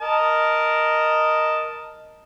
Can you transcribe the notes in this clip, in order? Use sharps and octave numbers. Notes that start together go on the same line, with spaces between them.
A#4 D#5 A5